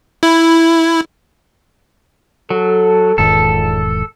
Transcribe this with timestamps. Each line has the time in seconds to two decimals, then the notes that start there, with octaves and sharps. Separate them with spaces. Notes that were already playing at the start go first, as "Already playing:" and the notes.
0.23 E4
2.50 F#3 A4
3.18 E1 C#2 G#2 D#3 A4